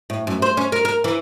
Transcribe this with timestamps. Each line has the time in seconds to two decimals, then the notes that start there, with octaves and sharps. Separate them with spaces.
0.10 A2
0.27 F#2
0.42 C5
0.57 C#4
0.72 A#4
0.85 A#4
1.04 E3